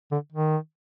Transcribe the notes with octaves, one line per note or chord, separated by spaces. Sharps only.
D3
D#3